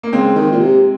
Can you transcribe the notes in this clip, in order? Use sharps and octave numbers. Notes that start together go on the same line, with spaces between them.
A#3
C#3 G#3 C4
D#3
A#2
C3